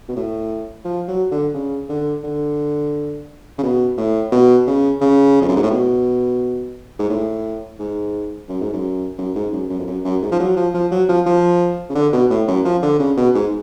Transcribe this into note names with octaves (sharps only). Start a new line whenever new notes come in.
B2
A2
F3
F#3
D3
C#3
D3
D3
C#3
B2
A2
B2
C#3
C#3
F2
F#2
G#2
A2
B2
G#2
A2
G#2
F#2
G#2
F#2
F#2
G#2
F#2
F#2
F2
F#2
F#2
G#2
F3
F#3
F3
F3
F#3
F3
F3
C#3
D3
B2
A2
F#2
F3
D3
C#3
B2
G#2